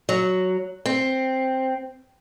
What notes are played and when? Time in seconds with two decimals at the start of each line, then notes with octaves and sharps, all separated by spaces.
0.09 F#3
0.86 C4